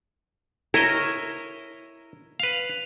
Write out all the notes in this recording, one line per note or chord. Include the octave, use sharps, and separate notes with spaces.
E4 A#4 C#5 D#5
B4 F5